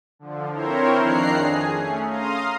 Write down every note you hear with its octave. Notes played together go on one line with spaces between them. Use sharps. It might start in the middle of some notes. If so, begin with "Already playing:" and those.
D3 F3
C4 E4 A#4 C5 C#5
F2 D#3 D4 A#5 F#6 C7
G#4
A3 C#4
F5 A#5 C6 D#6